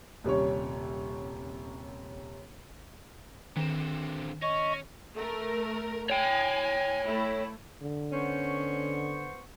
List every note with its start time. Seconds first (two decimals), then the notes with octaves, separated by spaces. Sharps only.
0.24 D#1 C3 G3 C#4 C#5
3.57 D3 D#3 C4 E7
4.42 C#4 D#5 C#6
5.15 A3 A#4
6.10 C#5 G5 G#5
7.05 A3 E4
7.82 D3
8.12 B3 C#4 C5 C#6